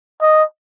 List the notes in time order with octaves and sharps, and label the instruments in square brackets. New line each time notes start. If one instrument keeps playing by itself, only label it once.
[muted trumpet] D#5